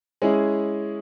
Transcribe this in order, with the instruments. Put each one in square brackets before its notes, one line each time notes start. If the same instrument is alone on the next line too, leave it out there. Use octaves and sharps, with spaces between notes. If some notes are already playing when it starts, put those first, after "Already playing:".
[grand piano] G#3 C#4 E4 G#4